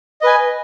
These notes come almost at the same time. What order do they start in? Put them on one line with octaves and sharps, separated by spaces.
D#5 B4 G#5